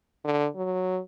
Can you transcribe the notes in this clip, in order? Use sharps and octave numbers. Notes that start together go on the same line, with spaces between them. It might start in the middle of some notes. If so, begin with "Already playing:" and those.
D3
F#3